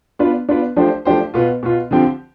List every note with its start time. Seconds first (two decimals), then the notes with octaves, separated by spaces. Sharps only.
0.19 B3 D4 F4 B4
0.49 B3 D4 F4 B4
0.76 F3 A3 D4 G4 C5
1.05 F3 A3 D4 G4 C5
1.34 B2 B3 F4
1.63 B2 B3 F4
1.91 D3 F3 C4 G4